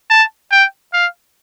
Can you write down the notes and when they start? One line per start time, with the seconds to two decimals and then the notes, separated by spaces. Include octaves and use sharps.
0.10 A5
0.52 G5
0.93 F5